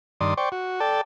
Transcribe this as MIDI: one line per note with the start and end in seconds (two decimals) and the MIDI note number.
0.21 0.34 43
0.21 0.34 51
0.21 0.34 74
0.21 0.34 84
0.21 0.34 87
0.37 0.49 72
0.37 0.49 74
0.37 0.49 79
0.37 0.49 85
0.52 0.80 66
0.80 1.01 69
0.80 1.01 74
0.80 1.01 79
0.80 1.01 81